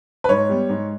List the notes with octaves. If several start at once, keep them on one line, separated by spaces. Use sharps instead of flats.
B4
G#2 C#5
G3 B3
G#2